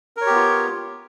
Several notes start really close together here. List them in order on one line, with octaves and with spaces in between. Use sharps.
A#4 C#5 G4 B3 F4